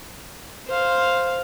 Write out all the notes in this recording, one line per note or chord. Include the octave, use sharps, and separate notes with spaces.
C5 F5